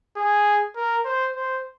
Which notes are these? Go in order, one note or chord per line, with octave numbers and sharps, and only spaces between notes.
G#4
A#4
C5
C5